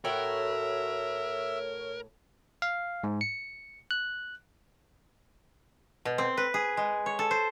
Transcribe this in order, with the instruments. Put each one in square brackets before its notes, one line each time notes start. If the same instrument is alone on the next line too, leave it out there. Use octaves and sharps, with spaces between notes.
[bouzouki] A2 F#4 G5 [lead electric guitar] A#4 [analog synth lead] C#5 [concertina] E5
[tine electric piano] F5
G#2
C#7
F#6
[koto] B2
C4
B4
G#4
G#3
C#5
A4
C5